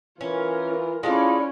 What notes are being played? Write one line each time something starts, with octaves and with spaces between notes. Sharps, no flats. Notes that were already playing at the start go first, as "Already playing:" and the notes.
E3 C#4 F4 A#4
G#3 C#4 E4 F4 A4 D5